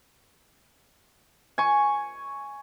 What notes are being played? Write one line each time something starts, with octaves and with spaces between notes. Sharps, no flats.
G#5 C#6